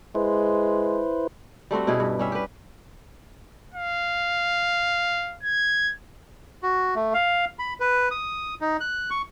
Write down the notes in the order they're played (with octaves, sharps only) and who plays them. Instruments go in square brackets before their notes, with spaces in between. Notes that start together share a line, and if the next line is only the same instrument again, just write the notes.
[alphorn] G#3 [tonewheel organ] E4 B4 C5
[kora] G3 A3 C4 F#4
B2 C#4 E4 G#4
G2
G3 C#4 E5
G4 B4
[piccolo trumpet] F5
G#6
[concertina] F#4
A3
F5
B5
B4
D#6
D#4
F#6
C#6